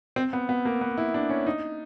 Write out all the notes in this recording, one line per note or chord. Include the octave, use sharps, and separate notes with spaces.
C4
B3
B3
A#3
B3
E4
D4
C#4
D#4